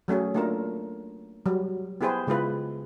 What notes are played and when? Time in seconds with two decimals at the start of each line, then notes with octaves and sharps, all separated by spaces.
0.08 F#3 A3 C#4 G#4
0.34 A3 A#3 D4 F4 A#4
1.46 F#3 G3
2.01 B3 E4 G4 G#4 B4 C5
2.27 C#3 G#3 E4 F4 B4